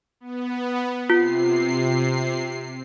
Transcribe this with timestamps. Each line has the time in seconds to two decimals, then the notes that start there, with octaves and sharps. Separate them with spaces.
0.20 B3
1.10 C3 F4 C7